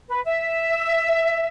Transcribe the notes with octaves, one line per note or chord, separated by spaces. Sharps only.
B4
E5